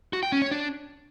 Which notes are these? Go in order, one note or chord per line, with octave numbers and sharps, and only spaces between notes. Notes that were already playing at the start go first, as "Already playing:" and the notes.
F#4
G5
C#4
C#5
D4